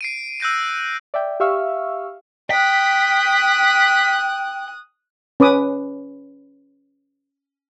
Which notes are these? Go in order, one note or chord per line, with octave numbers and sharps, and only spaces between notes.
C7 D7 D#7
E6 F#6 G6 A#6 D#7
D5 E5 G5
G4 E5 F5 C#6 E6 F6
G5 D#6 F#6 B6
C#4 B4 D6 D#6